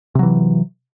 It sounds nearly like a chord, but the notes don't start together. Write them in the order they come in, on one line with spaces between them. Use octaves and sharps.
C3 F#3 E3